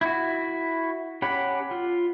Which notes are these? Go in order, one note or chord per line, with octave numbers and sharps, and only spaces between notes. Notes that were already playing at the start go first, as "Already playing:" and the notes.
E4 F#4
C#4 G4 F#5 B5
F4